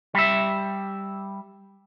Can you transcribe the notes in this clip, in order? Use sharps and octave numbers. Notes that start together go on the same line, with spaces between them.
G3 E5